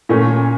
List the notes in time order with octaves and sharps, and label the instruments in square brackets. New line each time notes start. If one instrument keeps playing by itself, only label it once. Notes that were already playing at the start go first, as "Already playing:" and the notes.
[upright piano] A#2 A3 C#4